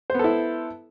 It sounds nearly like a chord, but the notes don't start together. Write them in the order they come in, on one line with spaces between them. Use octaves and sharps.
C5 B3 A4 E4